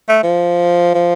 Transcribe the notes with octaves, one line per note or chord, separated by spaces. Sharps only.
A3
F3
F3